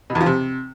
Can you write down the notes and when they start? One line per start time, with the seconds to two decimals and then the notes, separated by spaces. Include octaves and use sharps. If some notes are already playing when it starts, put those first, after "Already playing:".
0.10 B2
0.15 E2
0.21 F3
0.26 C3